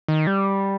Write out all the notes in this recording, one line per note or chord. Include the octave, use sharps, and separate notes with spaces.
D#3
G3